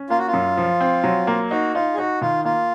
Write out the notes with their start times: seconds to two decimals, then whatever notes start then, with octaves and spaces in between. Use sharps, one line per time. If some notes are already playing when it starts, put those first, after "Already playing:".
Already playing: C#4
0.10 A#3 F4
0.18 F#4
0.27 F4
0.33 F#2
0.57 F3
0.81 C4
1.04 F#3
1.27 A#3
1.51 D#4 F#4
1.74 D#4 F4
1.94 G#4
1.98 D#4 F#4
2.21 D#3 F4
2.45 A#3 F4